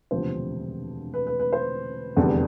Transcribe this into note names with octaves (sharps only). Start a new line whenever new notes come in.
E1 D2 C3 F3 B3 C5
B4
B4
B4
C5
F1 E2 D3 G3 D4